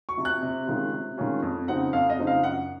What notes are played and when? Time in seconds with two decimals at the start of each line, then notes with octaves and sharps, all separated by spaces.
0.09 C#6
0.17 C3 F3
0.25 F#6
0.43 C3
0.67 D#3 G#3 C#4 F4
0.93 C3
1.17 D#3 G#3 C#4 F4
1.42 F2
1.68 C#3 F3 C4 D#4 F#5
1.93 F2 F5
2.10 D#5
2.18 C#3 F3 C4 D#4
2.27 F5
2.43 F#2 F#5